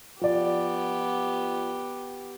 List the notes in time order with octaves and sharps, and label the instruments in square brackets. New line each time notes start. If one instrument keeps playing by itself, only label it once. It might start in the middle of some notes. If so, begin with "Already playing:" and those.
[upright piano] F3 D5 [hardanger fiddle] B3 G4